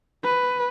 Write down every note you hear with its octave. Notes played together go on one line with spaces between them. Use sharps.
B4